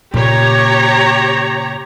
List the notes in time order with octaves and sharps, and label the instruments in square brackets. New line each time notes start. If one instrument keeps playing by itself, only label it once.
[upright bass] A#2 C#3 [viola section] G4 C#5 A#5